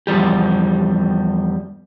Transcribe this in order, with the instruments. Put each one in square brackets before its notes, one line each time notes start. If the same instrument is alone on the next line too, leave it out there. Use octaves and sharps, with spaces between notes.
[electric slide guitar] E2 F3 G3 G4